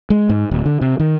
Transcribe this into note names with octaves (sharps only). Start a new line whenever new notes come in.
G#3
G#2
D1
D3
C3
D#3